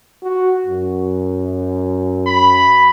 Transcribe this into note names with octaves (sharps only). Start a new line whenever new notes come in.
F#4
F#2
B5